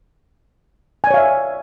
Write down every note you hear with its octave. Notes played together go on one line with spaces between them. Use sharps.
C#5 D5 E5 F5 G#5